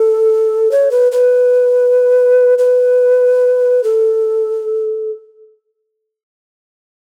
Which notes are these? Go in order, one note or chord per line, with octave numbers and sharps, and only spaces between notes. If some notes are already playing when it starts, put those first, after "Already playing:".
Already playing: A4
C#5
B4
B4
B4
A4